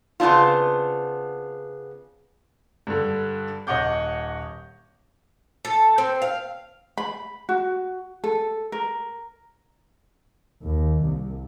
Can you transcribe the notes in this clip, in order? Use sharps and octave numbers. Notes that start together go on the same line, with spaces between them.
C#3 B3 C4 D4 F4
G2 D3
D#1 C#5 D#5 F#5 D6 G6
A4
C4
F5
B5
F#4
A4
A#4
D#2
C2